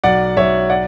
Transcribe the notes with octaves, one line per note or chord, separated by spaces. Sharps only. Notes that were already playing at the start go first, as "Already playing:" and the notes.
B1 D5 F#5
B1 C#5 E5
D5 F#5